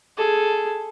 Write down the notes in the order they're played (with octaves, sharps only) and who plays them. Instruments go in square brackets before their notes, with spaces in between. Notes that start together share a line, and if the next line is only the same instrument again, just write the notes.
[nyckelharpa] G#4 A4